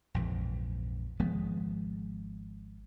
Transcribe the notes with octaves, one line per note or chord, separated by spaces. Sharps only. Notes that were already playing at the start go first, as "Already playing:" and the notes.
A#1 F2 G#2 E3
G#1 F3 G#3 B3